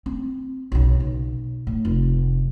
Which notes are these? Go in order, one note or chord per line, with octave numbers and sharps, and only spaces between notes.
C4
B1 C#3
B1
A2
F1